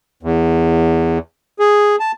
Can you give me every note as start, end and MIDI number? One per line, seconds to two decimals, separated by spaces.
0.23 1.18 40
1.59 1.96 68
2.00 2.12 81